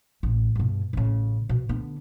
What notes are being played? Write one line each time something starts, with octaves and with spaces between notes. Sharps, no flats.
A1
G2 B2
A1 C#3
B2
D3 B3